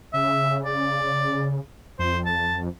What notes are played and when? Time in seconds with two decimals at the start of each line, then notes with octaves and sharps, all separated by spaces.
0.14 C#3 E5
0.65 D5
1.99 F2 C5
2.25 A5